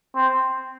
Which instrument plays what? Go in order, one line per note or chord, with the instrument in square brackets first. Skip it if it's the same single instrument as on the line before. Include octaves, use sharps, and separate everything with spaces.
[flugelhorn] C4